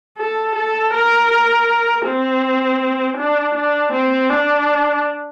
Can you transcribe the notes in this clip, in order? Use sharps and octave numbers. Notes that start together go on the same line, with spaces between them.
A4
A4
A#4
C4
D4
D4
C4
D4